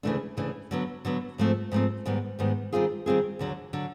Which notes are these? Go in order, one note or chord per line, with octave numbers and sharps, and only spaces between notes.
D2 C#3 E3 A3 D4
D2 C#3 E3 A3 D4
D3 F#3 B3
D3 F#3 B3
G#2 F3 A3 C4
G#2 F3 A3 C4
G#2 D#3 G3 B3
G#2 D#3 G3 B3
D#3 G3 C4 F4 G#4
D#3 G3 C4 F4 G#4
D#2 D3 F#3
D3 F#3